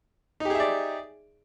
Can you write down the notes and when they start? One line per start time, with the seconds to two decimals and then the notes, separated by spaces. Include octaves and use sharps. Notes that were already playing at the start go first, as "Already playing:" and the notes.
0.40 D#4
0.45 G4
0.50 G#4
0.55 E5
0.60 D5